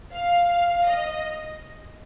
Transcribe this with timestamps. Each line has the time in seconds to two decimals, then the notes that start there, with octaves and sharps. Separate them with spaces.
0.14 F5
0.87 D#5